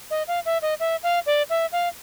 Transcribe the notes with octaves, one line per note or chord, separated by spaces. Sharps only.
D#5
F5
E5
D#5
E5
F5
D5
E5
F5